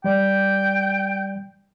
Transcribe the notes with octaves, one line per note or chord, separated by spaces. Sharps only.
G3 D5 G5